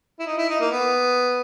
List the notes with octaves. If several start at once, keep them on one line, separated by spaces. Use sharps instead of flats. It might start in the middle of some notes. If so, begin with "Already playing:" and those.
E4
D#4
E4
D#4
A#3
B3